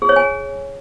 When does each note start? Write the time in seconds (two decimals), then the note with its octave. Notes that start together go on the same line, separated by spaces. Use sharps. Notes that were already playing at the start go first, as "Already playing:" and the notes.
0.02 G#4
0.09 C#5
0.16 G#5